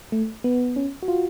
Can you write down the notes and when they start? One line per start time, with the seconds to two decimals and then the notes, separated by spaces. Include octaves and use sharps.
0.12 A3
0.44 B3
0.76 C#4
1.03 F#4
1.08 F4